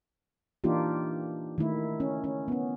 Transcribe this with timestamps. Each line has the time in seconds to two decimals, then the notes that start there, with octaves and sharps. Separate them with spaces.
0.64 E3 A#3 D4 D#4 F4 G4
1.58 D#3 A3 E4
2.00 C#4
2.24 C#4
2.48 B3 C#4